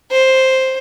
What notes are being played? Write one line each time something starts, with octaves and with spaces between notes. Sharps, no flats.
C5